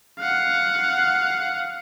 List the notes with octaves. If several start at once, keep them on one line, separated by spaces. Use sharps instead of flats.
F5 F#5